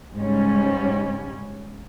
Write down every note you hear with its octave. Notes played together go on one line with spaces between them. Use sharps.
G#2 C#3 G3 C#4